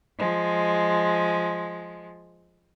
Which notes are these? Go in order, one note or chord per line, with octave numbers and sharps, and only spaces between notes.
F3 G#3